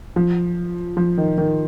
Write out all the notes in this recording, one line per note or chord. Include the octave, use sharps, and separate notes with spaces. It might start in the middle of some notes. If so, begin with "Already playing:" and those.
F3
F3
D#3
D#3